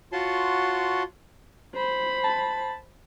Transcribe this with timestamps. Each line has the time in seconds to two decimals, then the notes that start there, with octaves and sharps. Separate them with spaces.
0.12 F4 F#4 C#5 F#5 A5 C6
1.74 C5 B5
2.24 A5